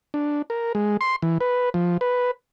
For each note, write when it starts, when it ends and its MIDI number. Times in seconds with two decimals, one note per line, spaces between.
0.14 0.42 62
0.50 0.72 70
0.75 0.97 56
1.01 1.16 84
1.22 1.38 52
1.41 1.69 71
1.74 1.97 53
2.01 2.31 71